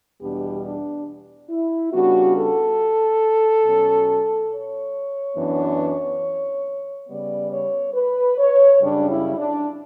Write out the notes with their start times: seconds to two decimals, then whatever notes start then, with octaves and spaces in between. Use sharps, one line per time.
0.20 E2 B2 G3 B3 D4 G4
0.64 D4
1.50 E4
1.92 C#3 G3 B3 D4 F#4
2.35 A4
3.65 B2 F#3 C#4
4.50 C#5
5.37 F#2 E3 B3 D4
7.09 C#3 G3 B3 D5
7.51 C#5
7.94 B4
8.38 C#5
8.81 F#2 C#3 G3 D4
9.10 E4
9.38 D4